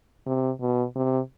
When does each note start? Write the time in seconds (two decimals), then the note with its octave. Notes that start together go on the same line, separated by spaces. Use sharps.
0.27 C3
0.61 B2
0.96 C3